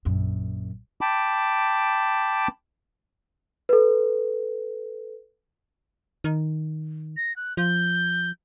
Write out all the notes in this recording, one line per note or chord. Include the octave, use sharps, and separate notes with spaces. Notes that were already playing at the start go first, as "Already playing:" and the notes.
A#1 F#2
G5 A5 B5 D6
A4 B4
D#3
A#6
F#6
F3 G6